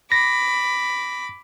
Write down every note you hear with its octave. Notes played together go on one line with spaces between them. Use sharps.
B5 D6 A#6